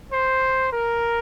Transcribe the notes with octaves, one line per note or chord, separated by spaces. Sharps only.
C5
A#4